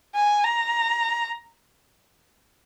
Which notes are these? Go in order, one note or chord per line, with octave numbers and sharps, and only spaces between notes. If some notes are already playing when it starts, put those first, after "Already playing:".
G#5
A#5